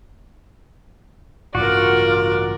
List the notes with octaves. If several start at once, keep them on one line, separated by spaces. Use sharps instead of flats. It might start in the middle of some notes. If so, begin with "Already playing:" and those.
A1 G2 C#3 F4 F#4 A#4 D5